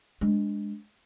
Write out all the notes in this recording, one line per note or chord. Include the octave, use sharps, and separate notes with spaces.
G#3 D4